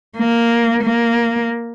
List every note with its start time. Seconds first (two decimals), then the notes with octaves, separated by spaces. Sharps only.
0.17 A#3
0.82 A#3